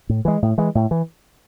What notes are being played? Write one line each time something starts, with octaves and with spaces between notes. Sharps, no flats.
A2
E3 G#3
A2
E3 G#3
A2
E3